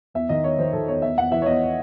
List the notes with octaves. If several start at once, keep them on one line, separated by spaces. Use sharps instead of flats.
E2 E5
D#3 D#5
E2 C#5
D#3 C5
D#3 A4
E2 C#5
E2 E5
E2 F#5
E3 E5
C#5
E2 D#5